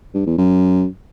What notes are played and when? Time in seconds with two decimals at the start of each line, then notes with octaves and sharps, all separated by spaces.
0.14 G2
0.26 E2
0.38 F#2